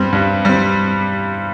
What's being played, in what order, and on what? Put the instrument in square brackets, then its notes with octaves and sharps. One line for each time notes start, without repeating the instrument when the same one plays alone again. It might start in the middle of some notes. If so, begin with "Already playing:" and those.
Already playing: [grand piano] G2 G3 C4
G2
G3 C4